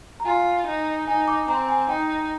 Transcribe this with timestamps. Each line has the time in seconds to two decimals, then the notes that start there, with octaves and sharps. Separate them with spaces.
0.20 A#5
0.25 F4 G#5
0.66 D#4
1.07 D#4 G#5
1.28 D6
1.48 C4 A#5
1.68 G#5
1.89 D#4 G5